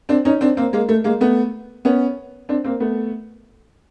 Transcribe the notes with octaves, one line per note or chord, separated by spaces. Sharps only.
C4 D4
C#4 D#4
C4 D4
A#3 C4
G#3 A#3
A3
G#3 A#3
A3 B3
B3 C#4
C4 D4
A#3 C4
A3 B3